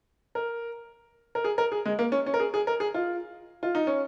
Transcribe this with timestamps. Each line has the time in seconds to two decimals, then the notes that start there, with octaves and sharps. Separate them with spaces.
0.35 A#4
1.35 A#4
1.44 G#4
1.58 A#4
1.72 G#4
1.85 G#3
1.99 A#3
2.12 C#4
2.26 C#4
2.34 A#4
2.40 G#4
2.54 G#4
2.67 A#4
2.80 G#4
2.94 F4
3.63 F4
3.75 D#4
3.87 C#4